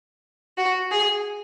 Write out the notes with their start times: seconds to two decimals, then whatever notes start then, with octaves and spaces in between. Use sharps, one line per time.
0.58 F#4
0.91 G#4